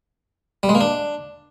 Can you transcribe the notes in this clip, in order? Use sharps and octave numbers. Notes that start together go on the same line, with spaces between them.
G3
G#3
A#3
D4